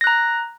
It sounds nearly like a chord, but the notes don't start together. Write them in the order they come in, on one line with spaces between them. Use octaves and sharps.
A#6 F#6 A#5